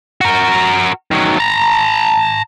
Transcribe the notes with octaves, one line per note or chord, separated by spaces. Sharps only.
F#4 A#4
D#3 F#3
A5 A#5